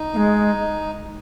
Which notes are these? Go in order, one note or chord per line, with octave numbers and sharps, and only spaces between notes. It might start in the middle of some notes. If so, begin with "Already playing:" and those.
Already playing: D#4
A#3
G#3